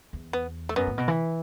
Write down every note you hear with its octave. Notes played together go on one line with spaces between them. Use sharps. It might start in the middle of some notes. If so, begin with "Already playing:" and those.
E2
B3
A3
F#2 B3
A2
B2
E3